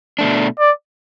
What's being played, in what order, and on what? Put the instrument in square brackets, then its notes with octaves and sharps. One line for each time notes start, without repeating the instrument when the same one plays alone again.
[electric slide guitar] B2 A3 D4
[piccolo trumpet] D5